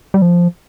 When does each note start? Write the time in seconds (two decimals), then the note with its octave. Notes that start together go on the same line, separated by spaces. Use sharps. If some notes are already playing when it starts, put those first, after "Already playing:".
0.14 G3
0.22 F3